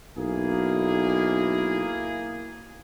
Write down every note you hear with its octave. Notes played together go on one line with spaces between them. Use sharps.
B1 A#3 E4 G#4